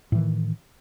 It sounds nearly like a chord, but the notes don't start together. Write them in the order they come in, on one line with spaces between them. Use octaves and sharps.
A2 E3 D#3